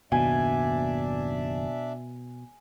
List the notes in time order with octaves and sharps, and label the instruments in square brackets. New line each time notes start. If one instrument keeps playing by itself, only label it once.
[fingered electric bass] F#1 D#2 [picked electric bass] B2 [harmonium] D4 D5 E5 [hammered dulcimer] G#5